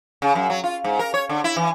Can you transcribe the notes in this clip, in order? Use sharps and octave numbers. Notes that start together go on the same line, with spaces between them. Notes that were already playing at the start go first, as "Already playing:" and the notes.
C#3
F#2
F#3
F4
G#2
A#4
C#5
D3
E4
E3